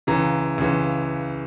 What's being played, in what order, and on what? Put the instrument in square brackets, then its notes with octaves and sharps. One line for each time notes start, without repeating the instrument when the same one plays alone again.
[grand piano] C#2 C#3 E3 A#5
C#2 C#3 E3